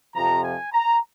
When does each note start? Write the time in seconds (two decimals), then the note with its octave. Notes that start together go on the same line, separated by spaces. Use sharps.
0.15 F2 C3 F3 A#5
0.44 G#5
0.72 A#5